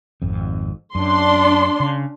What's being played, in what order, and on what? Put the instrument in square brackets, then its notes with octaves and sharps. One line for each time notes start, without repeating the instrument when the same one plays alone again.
[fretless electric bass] G#1 F2
[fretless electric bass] F#2 [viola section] D4 C6
[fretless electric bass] C#3